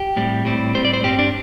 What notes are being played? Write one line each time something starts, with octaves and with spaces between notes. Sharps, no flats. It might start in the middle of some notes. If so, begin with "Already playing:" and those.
Already playing: G4
A2 G3 C4
A2 G3 C4
A2 G3 C4 C5
D5
C5
G2 G3 C4 G4
D4